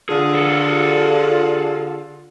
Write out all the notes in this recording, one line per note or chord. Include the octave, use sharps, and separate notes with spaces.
D3 F4 G#4
G#4 A4